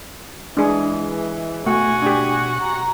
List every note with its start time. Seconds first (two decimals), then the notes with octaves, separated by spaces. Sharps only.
0.57 E3 G#3 D4 G#4
1.66 B2 A3 F#4 G#5
2.02 D4 G4
2.61 A#5